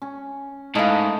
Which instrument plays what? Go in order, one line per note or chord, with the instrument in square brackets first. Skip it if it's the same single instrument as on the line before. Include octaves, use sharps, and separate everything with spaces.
[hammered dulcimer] C#4
[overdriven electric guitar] G#2 [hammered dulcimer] A3 A#4 D#5 [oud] E4 F5